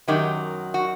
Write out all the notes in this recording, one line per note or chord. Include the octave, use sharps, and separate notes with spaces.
F#2 D#3 F#3 G4
F#4